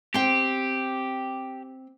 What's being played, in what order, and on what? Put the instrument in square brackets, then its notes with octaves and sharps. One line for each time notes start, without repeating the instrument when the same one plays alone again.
[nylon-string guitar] C4 G5 [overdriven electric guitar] G4